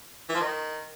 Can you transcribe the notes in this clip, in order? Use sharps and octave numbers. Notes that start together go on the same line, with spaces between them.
E3
F3
D#3